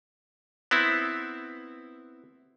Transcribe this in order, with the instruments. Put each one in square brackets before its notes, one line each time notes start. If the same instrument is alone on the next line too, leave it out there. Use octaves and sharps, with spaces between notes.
[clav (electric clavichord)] B3 C4 E4